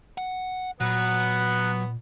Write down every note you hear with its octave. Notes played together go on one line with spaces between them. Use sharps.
F#5
A#2 F#3 B3 F#5